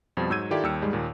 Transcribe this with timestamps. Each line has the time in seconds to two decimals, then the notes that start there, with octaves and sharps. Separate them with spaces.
0.17 F2 B2 F3 G3
0.30 G#2 F#3 E6 G6 G#6 D#7
0.51 D#3 E4 F4 G4 A4 D5
0.63 D#2 G3 G5 E6 F6 C#7
0.82 G#2 G3 G#3
0.93 D#2 A#2